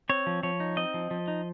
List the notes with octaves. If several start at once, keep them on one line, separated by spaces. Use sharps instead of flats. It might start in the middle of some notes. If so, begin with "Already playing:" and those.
C4 C#5
F3
F3 C#5
D#4
C4 D#5
F3
F3
D#4